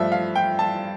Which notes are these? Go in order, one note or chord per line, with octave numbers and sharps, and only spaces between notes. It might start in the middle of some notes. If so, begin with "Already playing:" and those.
Already playing: G2 F3 A3 E5
F5
G5
A5